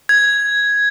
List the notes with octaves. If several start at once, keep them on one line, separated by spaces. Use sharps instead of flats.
G#6